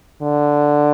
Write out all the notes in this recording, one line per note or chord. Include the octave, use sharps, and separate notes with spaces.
D3